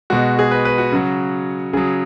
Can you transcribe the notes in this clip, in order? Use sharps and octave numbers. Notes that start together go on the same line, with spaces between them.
B2 G#3 F#4
G#4
B4
B4
F#4
C#3 F#3
C#3 F#3 G#4